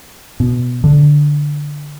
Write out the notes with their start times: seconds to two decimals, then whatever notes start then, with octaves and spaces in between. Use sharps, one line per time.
0.40 B2
0.84 D3